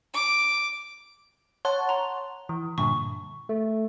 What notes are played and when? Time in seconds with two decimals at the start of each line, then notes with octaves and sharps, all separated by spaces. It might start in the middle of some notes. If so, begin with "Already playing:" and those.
0.14 D6
1.65 C#5 F#5 A5 C6
1.89 A#5 C6
2.49 E3
2.78 G2 A#2 D3 C#6
3.49 A3